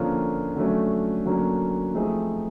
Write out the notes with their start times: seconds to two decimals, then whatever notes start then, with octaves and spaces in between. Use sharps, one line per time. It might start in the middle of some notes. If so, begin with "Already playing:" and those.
Already playing: D3 F3 A#3 C#4 F4
0.56 D3 F#3 A3 C#4
1.26 D3 F#3 A#3 C#4
1.94 F3 A3 C4 D#4 G#4